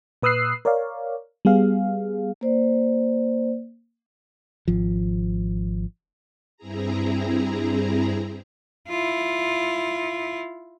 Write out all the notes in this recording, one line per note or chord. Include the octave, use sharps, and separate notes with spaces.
A#2 B4 D#6 E6 F#6 C7
A#4 C#5 D5 F5
G3 B3 G#4 F5
A#3 C5 D5
G#1 F3
G2 C4 E4 G#4 A#5
E4 F4